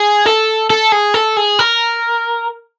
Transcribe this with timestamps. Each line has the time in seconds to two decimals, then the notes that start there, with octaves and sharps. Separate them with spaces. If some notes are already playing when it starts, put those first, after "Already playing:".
Already playing: G#4
0.26 A4
0.70 A4
0.92 G#4
1.14 A4
1.37 G#4
1.59 A#4